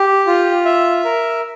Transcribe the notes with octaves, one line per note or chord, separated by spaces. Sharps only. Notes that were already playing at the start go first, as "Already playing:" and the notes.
Already playing: G4
F4
E5
A#4